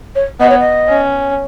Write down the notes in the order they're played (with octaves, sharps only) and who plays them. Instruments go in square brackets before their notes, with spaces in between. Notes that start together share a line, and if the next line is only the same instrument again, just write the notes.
[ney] C#5
[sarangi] B3 [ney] D#5
[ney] C#5
D#5
[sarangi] C#4